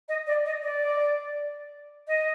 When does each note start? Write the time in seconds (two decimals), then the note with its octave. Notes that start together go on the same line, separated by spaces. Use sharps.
0.09 D#5
0.27 D5
0.45 D#5
0.62 D5
2.08 D#5